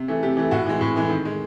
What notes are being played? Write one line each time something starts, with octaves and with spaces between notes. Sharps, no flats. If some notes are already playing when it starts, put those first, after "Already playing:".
Already playing: C3
E3 A3
C3 G4
E3 A3
A2 F#4
E3 G#3
A2
E3 G#3
D#3
G#3